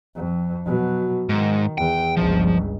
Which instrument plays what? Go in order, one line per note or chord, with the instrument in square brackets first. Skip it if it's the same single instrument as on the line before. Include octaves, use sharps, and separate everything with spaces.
[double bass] F2
B2 F#3
[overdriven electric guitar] G#2 [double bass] D#3
[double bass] E2 [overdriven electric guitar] G5
[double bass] G1 C#2 [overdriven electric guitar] F3